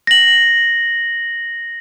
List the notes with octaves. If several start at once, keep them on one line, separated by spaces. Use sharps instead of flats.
A#6 F#7